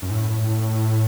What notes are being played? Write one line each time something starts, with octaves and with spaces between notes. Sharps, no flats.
F#2
A2